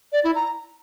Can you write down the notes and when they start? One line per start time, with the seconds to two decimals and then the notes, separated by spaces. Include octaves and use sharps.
0.12 D5
0.24 E4
0.35 A#5